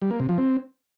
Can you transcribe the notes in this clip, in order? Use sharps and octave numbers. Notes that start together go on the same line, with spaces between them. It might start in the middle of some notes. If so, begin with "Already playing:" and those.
G3
A#3
C3
F3
C4